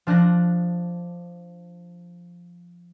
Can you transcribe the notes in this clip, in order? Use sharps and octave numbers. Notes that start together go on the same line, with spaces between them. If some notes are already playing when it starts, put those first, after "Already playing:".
F3 D4 F#6 A#6